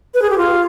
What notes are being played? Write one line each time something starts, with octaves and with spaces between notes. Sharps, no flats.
B4
G#4
G4
F4